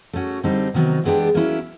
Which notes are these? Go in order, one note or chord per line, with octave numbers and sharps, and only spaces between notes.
A3 C#4 F#4
D3 G3 C4 D#4
C3 D#3 F#3 B3 D#4
E3 G#3 B3 D4 G4
F#3 A#3 C#4 E4